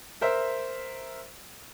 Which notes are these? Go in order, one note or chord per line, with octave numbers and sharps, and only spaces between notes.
A#4 C5 E5